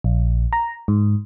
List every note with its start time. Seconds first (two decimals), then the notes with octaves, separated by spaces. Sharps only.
0.04 A#1
0.53 A#5
0.88 G#2